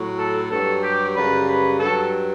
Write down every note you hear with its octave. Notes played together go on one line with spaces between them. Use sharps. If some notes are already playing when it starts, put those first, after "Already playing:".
Already playing: A2 F#3
A4
G2 F#3 A4
G4
F#2 C#3 G3 B4
B4
G2 F#3 A4